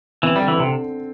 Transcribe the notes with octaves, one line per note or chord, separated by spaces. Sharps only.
E3 C4
D3 G3
E3
C3 A4